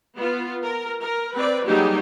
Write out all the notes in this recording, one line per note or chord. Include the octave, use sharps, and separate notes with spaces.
B3 F4
A#4
A#4
C4 B4 D5
F#3 G3 A#3 D#4 G4 G#4